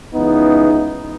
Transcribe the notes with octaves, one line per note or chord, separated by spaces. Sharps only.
C#2 C#3 E3 B3 D#4